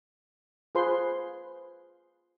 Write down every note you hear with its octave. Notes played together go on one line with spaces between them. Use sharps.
F4 G#4 B4 C5 C6